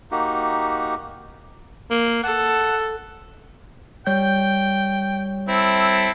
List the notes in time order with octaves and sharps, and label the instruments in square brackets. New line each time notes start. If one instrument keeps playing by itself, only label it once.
[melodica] A#3 D#4 F#4 G4
[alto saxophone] A#3
[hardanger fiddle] A4 [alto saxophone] F#5
[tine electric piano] G3 C#5 G6 [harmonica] G5
[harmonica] C4 E4 A4